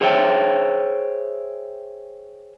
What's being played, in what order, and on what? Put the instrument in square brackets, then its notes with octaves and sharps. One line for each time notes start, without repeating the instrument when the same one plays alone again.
[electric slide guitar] G#4 C5 C#5 E5 G5